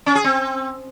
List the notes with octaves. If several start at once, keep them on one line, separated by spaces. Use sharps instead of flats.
C#4
G#4
C4